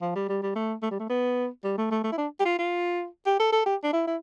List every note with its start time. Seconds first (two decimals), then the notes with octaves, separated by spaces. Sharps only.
0.01 F3
0.15 G3
0.29 G3
0.43 G3
0.55 A3
0.82 A3
0.91 G3
0.99 A3
1.10 B3
1.64 G3
1.78 A3
1.91 A3
2.04 A3
2.12 E4
2.18 D4
2.40 G4
2.45 F4
2.59 F4
3.26 G4
3.39 A4
3.52 A4
3.66 G4
3.84 D4
3.93 E4
4.07 E4